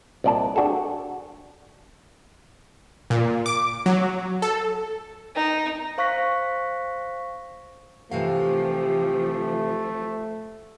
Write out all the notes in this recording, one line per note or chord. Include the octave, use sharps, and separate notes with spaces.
C2 A#2 D5 D#5 A5
D4 F#4 G#4 A4
A#2
D6
F#3
A4
D#4
C5 F5 C#6 F#6 A#6 B6
C3 E3 F3 A3 G4 F5